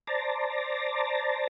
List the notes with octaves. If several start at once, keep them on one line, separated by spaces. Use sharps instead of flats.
C5 D5 A5 A#5